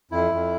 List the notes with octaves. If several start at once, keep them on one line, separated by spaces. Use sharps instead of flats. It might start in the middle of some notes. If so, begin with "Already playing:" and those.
F2 E4
F2